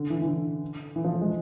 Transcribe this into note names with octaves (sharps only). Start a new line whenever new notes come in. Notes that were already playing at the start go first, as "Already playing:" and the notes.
Already playing: D3
E3
E3
D3
E3
F3
A3
G#3